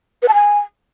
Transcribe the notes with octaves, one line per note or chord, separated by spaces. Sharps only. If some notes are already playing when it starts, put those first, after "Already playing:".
B4
A5
G#5